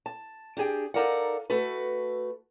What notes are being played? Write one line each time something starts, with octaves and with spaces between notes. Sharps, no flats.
A5
D4 G4 G#4 G5
D#4 A4 A#4 D5 F5 F#5
A3 F#4 A4 B4